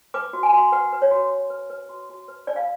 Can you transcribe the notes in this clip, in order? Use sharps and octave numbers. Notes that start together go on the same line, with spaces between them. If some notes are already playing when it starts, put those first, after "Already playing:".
B4 D6
F#4
G#5
F#4
B4 F#5
B4
C#5
F#4
F#4
B4
B4
F#4
F#4
B4
D4 D5
F5